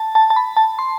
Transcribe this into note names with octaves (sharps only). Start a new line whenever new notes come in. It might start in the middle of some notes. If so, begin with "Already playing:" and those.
Already playing: A5
A5
A5
B5
A5
C6